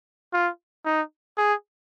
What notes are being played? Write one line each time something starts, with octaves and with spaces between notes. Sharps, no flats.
F4
D#4
G#4